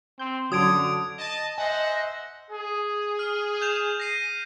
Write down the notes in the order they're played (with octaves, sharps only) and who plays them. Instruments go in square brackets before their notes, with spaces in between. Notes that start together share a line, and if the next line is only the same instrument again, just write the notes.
[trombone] C4 [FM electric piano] G6
[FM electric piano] F#2 F#3 [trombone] D3 [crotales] D#6 G#6 D7
[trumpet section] D#5 A5
[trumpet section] C5 E5 F#5 [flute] D#5 [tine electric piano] G#5
[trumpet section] G#4
[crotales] F6
G6 E7 F7
A#6 C7 D#7